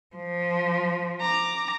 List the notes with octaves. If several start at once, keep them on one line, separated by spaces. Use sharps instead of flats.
F3
A#5 D6